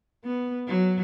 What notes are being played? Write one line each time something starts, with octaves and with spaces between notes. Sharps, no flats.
B3
F#3